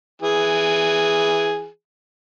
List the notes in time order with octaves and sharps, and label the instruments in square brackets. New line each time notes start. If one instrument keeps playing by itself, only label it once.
[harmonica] E3 G#4